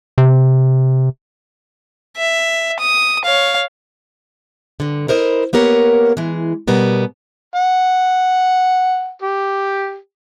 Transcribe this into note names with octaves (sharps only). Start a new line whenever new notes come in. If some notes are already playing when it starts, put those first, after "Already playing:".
C3
E5
D#6
C#5 F5
G2 D3
E4 A#4 C5 D5 D#5
A#3 B3 G4 A#4 C#5
E3 G#3
B2 G3 B3 A#4
F#5
G4